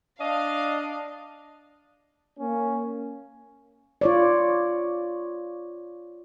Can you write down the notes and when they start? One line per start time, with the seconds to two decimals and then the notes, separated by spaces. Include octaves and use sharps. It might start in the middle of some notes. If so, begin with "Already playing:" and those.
0.20 D4 D#5 F5
2.38 A#3 C#4
4.01 F4 C#5 D5